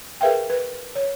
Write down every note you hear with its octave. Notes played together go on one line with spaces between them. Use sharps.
G#4 A#4 B4 E5 F5 G5
B4
C#5